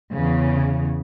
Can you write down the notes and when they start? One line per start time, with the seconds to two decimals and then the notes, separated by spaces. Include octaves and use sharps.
0.13 E2 C#3